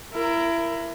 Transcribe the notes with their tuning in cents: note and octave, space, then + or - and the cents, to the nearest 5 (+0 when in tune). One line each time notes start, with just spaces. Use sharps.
E4 +25 A#4 +0